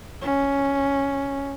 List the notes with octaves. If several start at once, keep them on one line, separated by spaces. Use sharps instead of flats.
C#4